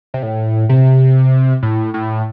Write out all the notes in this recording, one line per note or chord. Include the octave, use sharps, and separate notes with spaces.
C3
A2
C3
A2
A2